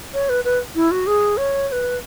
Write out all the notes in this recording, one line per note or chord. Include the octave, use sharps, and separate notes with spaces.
C#5
B4
B4
E4
F#4
G#4
C#5
C#5
B4